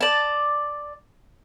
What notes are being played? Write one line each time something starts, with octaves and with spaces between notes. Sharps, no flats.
D5 A5